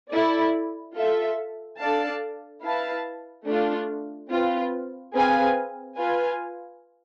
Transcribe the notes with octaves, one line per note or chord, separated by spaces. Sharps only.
E4 A4 D5
F4 A4 E5
D4 A4 D5 F5 A5
E4 B4 F5 A5
A3 D4 F4
C4 F4 B4
C4 G#4 B4 F5 G#5
F4 B4 F5 G#5